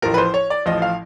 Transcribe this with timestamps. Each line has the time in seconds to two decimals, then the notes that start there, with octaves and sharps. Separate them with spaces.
0.02 A1 A2 F3 A#4
0.14 B4
0.18 C5
0.34 C#5
0.50 D5
0.66 A1 A2 F3 D#5
0.82 F5